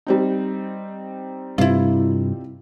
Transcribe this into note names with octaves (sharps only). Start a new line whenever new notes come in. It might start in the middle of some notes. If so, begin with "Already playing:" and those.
G3 C4 D#4
G2 C3 E4 F4